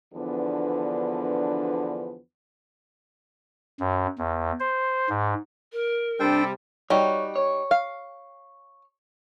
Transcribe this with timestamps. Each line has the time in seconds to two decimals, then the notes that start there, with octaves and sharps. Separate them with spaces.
0.14 E2 D3 F3 B3 D4 B4
3.80 F#2
4.18 E2
4.60 C5
5.09 G#2
5.72 A#4
6.20 C3 G3 D4 A4 C5 G5
6.90 G3 D#4 F#4 C#5
7.36 C#5
7.71 F5